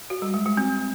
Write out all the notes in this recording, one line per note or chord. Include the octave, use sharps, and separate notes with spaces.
F#4
G3
G#3
G#3
C4